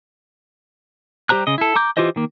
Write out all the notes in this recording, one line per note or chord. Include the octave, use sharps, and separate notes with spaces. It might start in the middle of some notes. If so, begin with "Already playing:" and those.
G3 G4 C5 A#5 F#6
C#3 D#5
E4 A4
A#5 D6 G6
E3 F4 G4 C5 D#5
D#3 A#3